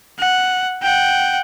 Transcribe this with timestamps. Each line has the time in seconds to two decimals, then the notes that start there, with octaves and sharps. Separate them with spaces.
0.19 F#5
0.82 F#5 G5